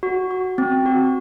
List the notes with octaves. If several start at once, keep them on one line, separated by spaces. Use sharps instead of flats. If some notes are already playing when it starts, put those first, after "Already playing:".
F#4
F#4
C4
F#4